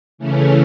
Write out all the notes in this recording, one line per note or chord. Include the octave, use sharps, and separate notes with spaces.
C#3 E3 A3 C#4